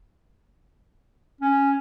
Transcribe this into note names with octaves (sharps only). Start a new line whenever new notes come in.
C#4